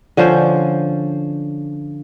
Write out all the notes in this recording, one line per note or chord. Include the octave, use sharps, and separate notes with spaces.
D3 F3 C#4 C5